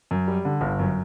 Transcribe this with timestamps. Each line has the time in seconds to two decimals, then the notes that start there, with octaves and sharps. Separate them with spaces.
0.11 F#2
0.28 G3
0.45 D3
0.61 G1
0.79 F#2